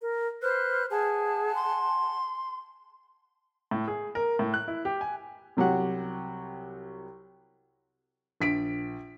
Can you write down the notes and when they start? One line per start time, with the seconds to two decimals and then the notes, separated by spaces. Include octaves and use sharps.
0.02 A#4
0.42 B4 C5 F6 F#6
0.90 G#4 F#5 G#5 A5
1.55 C6
3.71 A2
3.88 G#4
4.15 A#4
4.39 A2
4.54 F#6
4.68 E4
4.85 G4
5.01 G#5
5.57 C2 F#3 G4 F#5
8.41 A#1 B6 D7